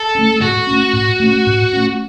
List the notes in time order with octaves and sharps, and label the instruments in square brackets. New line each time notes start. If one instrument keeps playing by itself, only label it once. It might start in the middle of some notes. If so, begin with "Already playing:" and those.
Already playing: [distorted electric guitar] A4
[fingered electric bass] A3 C#4
[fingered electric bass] A2 [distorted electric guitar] F#4
[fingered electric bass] A3 C#4
A2
A3 C#4
A2
A3 C#4